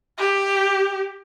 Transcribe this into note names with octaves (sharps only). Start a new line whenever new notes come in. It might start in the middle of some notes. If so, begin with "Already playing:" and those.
G4